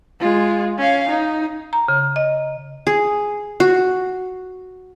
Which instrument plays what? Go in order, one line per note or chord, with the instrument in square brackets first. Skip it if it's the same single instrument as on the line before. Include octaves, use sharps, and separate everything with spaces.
[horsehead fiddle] G#3 F4
C#4 F5
D#4
[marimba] A#5
C#3
D#5
[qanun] G#4
F#4